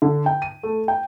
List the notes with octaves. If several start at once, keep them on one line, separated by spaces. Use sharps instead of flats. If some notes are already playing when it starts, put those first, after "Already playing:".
D3
G5
D#7
A3
G5